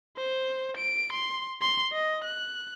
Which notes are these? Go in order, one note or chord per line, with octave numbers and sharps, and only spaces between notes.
C5
D7
C6
C6
D#5
F#6